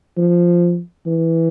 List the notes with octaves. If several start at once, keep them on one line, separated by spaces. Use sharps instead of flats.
F3
E3